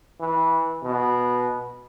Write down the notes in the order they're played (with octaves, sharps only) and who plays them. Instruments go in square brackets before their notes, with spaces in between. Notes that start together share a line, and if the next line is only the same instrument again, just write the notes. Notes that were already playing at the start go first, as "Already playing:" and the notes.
[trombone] E3
B2